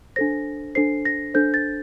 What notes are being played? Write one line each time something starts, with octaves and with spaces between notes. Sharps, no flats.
D4 A4 C5 A#6
D4 A4 C5 C7
A#6
D4 A4 C5 G6
A6